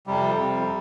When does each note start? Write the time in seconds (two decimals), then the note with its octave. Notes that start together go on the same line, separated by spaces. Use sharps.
0.07 F2 C3 G3
0.35 F2 C3